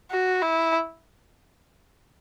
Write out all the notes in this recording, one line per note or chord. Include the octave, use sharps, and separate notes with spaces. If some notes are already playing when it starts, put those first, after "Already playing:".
F#4
E4